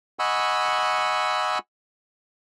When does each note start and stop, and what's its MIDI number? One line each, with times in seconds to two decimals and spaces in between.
0.19 1.58 75
0.19 1.58 78
0.19 1.58 80
0.19 1.58 83
0.19 1.58 85
0.19 1.58 88